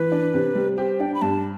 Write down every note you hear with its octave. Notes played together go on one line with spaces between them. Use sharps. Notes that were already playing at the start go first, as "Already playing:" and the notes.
Already playing: E3 B4
D4
C3
G3
G4 C5
D4 G5
B5
G2 A5